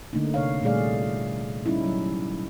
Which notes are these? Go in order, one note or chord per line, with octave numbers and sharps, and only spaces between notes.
D3 A3 A#3 D4 D#4
C3 C#5 F5
A#2 G3 A3 G#4 D5 F5
G3 C#4 D#4 E4
F#3